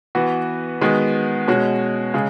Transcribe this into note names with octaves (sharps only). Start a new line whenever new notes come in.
E3 B3 F#4
D#3 G#3 B3 F#4
B2 G#3 C#4 F#4
C#3 G#3